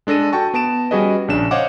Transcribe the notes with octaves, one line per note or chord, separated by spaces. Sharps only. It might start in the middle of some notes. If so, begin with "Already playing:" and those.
G#3 D4 A4 A#6 D#7
F#4 G5 A5 C#6
B3 A5 D7 E7
G3 C#4 F#4 G#4 B4 D#5
A#1 C#3 D4 E7
C5 C#5 D#5 F5 F#5 D6